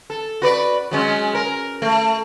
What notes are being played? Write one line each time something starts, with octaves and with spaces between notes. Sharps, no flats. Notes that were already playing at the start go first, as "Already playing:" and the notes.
A4
F#4 B4 D5
F#3 G#3 C#4
A#4
A3